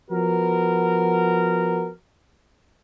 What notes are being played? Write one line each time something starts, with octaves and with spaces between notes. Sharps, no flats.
F3 B3 F#4 A#4